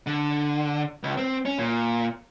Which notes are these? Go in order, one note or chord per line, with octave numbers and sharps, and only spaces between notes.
D3
C#2
C4
C#4
A#2